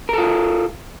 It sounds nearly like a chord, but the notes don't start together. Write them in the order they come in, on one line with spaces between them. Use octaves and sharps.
A#4 A4 F4